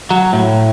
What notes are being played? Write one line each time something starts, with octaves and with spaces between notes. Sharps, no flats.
F#3
A2